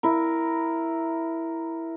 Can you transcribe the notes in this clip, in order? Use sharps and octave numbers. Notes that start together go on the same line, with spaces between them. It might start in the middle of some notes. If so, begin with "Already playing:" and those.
E4 A#4